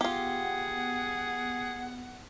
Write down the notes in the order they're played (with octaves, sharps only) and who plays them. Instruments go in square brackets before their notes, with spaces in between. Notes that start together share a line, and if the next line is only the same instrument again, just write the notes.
[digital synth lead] B3 [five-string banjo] F4 G4 [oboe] G#4 [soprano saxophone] F#5